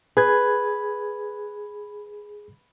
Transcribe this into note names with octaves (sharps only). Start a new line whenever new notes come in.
G#4 B4 G#6